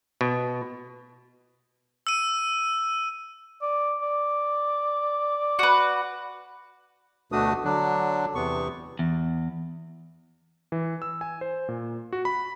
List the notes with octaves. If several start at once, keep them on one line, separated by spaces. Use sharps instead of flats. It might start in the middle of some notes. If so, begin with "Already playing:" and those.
B2
E6 D#7
D5
D5
F#4 B4
D2 B2 A3 D4 F#4 D#6
D3 F#3 D4
E2 C3 B3 C#6
E2
E3
E6
G#5
C5
A#2
F#4
B5